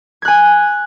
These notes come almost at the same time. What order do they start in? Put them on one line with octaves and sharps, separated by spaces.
G#6 F#6 G#5